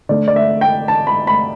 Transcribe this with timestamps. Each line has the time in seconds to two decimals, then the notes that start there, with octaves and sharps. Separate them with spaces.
0.09 D3 A3 D5
0.28 D5
0.36 E5
0.61 G5
0.88 A5
1.07 B5
1.27 B5